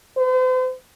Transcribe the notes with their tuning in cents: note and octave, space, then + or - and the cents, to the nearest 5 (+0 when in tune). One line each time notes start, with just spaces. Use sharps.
C5 -40